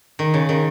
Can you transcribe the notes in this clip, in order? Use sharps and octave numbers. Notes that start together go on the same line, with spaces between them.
D#3
C#3
D#3